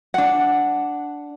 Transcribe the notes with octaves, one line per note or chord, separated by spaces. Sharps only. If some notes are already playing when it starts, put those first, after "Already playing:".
D4 F#5